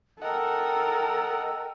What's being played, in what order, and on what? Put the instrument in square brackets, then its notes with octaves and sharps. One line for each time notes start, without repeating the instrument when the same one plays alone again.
[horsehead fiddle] A4 [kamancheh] A#4 [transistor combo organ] D#5 F#5 [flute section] G5 E6